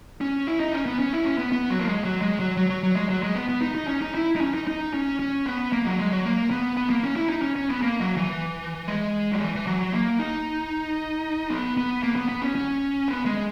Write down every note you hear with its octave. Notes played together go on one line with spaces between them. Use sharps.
C#4
E4
D#4
C#4
B3
C#4
E4
C#4
B3
B3
F#3
A#3
G#3
F#3
G#3
F#3
F#3
F#3
F#3
G#3
F#3
G#3
B3
B3
D#4
D#4
C#4
D#4
E4
D#4
C#4
D#4
D#4
C#4
C#4
B3
A#3
F#3
G#3
F#3
A#3
B3
B3
A#3
C#4
E4
D#4
C#4
C#4
B3
A#3
F#3
E3
G#3
F#3
E3
E3
F#3
A#3
D#4
B3
B3
A#3
B3
B3
C#4
C#4
B3
G#3